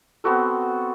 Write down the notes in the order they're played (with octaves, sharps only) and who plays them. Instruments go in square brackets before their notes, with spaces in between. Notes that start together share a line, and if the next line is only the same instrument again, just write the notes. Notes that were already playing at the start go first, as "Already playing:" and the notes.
[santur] B3 C4 F#4 A4